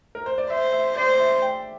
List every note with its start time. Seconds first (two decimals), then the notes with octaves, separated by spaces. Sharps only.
0.15 A#4
0.26 C5
0.38 D5
0.50 C5 E5
0.73 E5
0.96 C5 D5
1.19 E5
1.42 G5